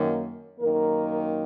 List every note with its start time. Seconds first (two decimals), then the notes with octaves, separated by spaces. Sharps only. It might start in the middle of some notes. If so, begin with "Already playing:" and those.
Already playing: F#2 D#3 A#3
0.60 F#2 D#3 A#3 A#4